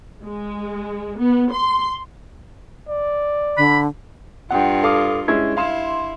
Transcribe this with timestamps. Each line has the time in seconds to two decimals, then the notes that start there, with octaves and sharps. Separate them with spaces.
0.23 G#3
1.20 B3
1.53 C6
2.89 D5
3.57 D3 B5
4.51 G2 F4 F#5 G5
4.84 A4 F5 D6 D#6
5.28 G#3 C#4 E4 G#6
5.57 E4 F5 C6 E7